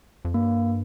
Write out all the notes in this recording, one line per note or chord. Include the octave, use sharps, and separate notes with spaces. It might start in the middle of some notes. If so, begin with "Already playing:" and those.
F2
G2 A#3